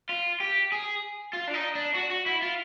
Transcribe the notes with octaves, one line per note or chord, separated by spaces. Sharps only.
F4
G4
G#4
F4
D4
D#4
D4
F#4
F#4
E4
F4